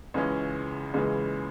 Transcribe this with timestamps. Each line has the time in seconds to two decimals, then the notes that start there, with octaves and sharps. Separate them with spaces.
0.14 C#2 C#3 E3 G#3 C#4
0.94 C#2 C#3 E3 G#3 C#4